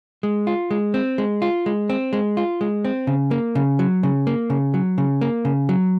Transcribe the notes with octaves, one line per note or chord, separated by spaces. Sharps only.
G#3
F4
G#3
C4
G#3
F4
G#3
C4
G#3
F4
G#3
C4
C#3
A#3
C#3
F#3
C#3
A#3
C#3
F#3
C#3
A#3
C#3
F#3